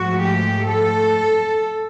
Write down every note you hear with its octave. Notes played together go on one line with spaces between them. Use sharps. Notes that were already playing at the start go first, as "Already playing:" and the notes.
Already playing: G#2 F3 A3 F#4
G4
A4